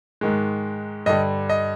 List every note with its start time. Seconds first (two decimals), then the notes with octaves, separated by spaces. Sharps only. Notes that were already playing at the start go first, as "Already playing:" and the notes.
0.21 G#2 D#3 G#3
1.06 G2 D3 G3 D#5
1.49 D#5